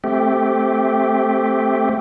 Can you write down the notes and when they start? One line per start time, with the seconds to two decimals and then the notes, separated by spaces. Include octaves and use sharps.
0.04 A3 C4 G4